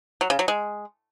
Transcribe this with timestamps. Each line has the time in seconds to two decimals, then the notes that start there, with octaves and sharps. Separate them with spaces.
0.21 F#3
0.30 C#3
0.39 F#3
0.48 G#3